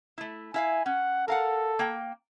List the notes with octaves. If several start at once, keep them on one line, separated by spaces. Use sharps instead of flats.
A3 E4
E4 E5 F5 G#5
C#4 F#5
A4 A#4 F5 F#5
A#3 G5